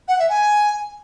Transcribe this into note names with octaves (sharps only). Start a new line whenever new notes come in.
F#5
E5
G#5